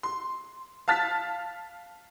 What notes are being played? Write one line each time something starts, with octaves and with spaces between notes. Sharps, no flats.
C6
F5 A5 F6 A6 B6